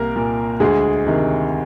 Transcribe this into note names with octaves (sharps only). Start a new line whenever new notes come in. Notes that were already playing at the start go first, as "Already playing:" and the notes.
Already playing: C2 A#3 A#4
A#2
D2 G#3 G#4
C3 D#3